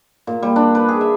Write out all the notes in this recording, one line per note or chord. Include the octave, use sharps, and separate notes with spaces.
A#2
G3
D4
B4
G#4
E5